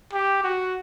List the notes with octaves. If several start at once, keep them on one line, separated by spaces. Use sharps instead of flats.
G4
F#4